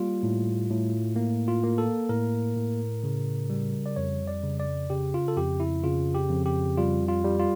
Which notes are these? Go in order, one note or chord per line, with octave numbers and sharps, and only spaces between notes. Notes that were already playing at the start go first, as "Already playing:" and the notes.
Already playing: G3 A#3 F4
A2
A2
A#3
F4
A#3
A4
A2 A#4
A2
C#3
G3
D5
F2 C#5
D5
C#3
D5
C#3 G4
F4
A4
F2 G4
E4
C#3 F4
G4
F2
G4
G3 F4
F4
G3
F4